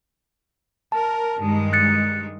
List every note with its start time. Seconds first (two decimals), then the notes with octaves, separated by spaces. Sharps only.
0.92 A#4 A5
1.37 G2 D#3 G#3
1.73 F#6 A6 C#7